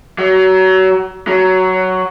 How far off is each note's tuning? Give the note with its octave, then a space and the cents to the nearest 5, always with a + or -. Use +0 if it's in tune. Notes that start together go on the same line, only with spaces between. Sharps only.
F#3 +25
F#3 +10